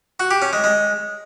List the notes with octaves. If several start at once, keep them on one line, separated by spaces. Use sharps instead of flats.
F#4
G4
C#4
G#3
G#3